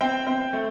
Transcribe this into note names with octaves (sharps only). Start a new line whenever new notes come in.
C4 G5
C4
A3